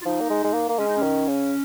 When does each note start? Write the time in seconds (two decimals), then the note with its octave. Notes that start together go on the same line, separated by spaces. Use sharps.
0.02 F4
0.05 F3 D#4
0.21 A#3
0.30 G#3
0.44 G#3
0.54 A#3
0.69 A#3
0.79 G#3 C#4
0.87 D#4
0.96 C#4
1.03 D#3
1.27 C#3